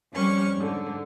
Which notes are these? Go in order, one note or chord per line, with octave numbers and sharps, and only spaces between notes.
F2 G3 C#4 C#6 F6
G#2 D3